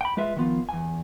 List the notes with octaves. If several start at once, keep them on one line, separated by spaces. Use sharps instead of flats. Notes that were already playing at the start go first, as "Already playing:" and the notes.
G5 B5
G#3 F4 B4 E5
D#3 F3 B3 F4
E2 G#5